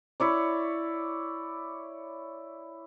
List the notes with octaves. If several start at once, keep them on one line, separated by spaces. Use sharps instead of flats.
E4 C#5 D5